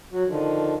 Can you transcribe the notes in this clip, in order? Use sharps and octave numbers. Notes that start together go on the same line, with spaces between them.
F#3 F#4
D3 D#3 F3